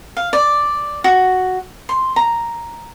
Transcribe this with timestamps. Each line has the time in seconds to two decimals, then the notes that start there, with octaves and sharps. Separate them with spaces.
0.17 F5
0.33 D5
1.04 F#4
1.89 C6
2.16 A#5